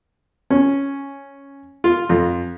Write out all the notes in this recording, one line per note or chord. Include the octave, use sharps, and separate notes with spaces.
C#4
F4
F2